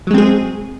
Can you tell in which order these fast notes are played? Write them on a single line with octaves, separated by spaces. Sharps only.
F#3 G#3 C4 G#4